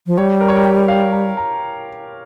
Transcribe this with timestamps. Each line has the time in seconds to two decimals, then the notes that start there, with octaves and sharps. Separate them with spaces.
0.07 F3
0.17 G3 C#5
0.41 A#4
0.48 C#5
0.56 A#4
0.65 G4
0.88 F5
1.12 A#5
1.37 A#5